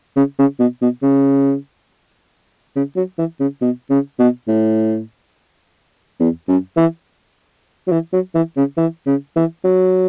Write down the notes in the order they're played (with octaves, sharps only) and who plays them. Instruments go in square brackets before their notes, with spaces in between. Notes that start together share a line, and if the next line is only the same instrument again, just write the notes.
[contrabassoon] C#3
C#3
B2
B2
C#3
C#3
F#3
E3
C#3
B2
C#3
B2
A2
E2
F#2
E3
F#3
E3
F#3
E3
C#3
E3
C#3
E3
F#3